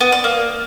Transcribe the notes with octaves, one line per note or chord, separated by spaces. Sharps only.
B3
D5
A#3